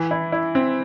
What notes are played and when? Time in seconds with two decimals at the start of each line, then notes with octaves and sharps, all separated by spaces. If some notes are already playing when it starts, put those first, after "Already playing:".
Already playing: E3
0.11 E4
0.32 E4
0.55 C4